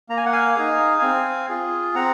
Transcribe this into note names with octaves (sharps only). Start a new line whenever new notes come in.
A#3 A#5
G#5
F#5
F5 G#5
D#4 G#4
C4
F4 G#4
C4 F#5 A#5